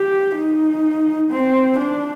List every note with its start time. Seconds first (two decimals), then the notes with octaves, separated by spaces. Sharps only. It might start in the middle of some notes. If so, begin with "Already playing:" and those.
Already playing: G4
0.35 D#4
1.31 C4
1.79 D4